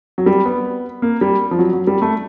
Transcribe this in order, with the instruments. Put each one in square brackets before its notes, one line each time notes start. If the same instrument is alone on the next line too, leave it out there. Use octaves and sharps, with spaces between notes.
[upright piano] F#3
G3
B3
A#3
G3
F3
F#3
F#3
G3
A3